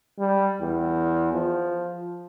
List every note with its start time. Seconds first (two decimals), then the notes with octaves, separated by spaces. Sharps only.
0.18 G3
0.60 E2
1.33 F3